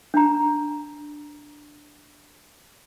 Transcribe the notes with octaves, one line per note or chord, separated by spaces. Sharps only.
D4 A#5